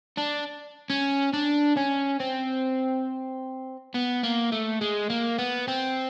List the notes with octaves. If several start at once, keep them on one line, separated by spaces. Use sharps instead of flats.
D4
C#4
D4
C#4
C4
B3
A#3
A3
G#3
A#3
B3
C4